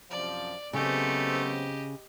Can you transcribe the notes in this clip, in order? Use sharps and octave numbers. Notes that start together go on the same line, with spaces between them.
F#2 C3 F3 D5
C#3 F#3 A3 B3 C4 G4 D#5